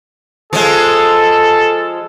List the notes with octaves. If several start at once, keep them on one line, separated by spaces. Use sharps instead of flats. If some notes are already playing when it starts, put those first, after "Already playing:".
F3 G#3 A4